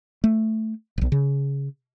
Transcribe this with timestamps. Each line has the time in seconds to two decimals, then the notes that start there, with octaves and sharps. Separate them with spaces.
0.24 A3
0.98 D#1 B1
1.12 C#3